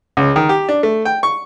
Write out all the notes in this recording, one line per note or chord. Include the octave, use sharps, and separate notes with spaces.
C#2
D#3
G4
D4
A3
G5
C#6